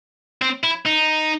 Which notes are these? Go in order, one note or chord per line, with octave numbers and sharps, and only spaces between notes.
C4
E4
D#4